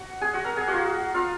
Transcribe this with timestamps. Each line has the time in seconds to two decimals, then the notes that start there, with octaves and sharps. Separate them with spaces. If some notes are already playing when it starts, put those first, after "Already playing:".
Already playing: F#4 F#5
0.21 G#4 G#5
0.33 F#4 F#5
0.44 A#4 A#5
0.56 G#4 G#5
0.68 A#3 F4 F#4 F#5
1.14 F4 F5